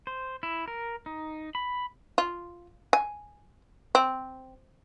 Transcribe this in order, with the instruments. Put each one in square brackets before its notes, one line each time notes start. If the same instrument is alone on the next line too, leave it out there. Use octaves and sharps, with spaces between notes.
[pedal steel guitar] C5
E4
A#4
D#4
B5
[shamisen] F4
G#5
C4